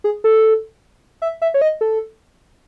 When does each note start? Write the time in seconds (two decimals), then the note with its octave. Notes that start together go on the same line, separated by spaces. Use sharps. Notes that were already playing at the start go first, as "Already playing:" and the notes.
0.04 G#4
0.24 A4
1.22 E5
1.42 E5
1.54 C#5
1.62 D#5
1.81 A4